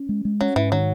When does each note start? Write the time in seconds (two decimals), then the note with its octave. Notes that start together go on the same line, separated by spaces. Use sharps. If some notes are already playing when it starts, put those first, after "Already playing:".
Already playing: C#4
0.09 G#3
0.25 G#3
0.41 F#3 C#4
0.56 G#2 E3
0.72 D#3 F#3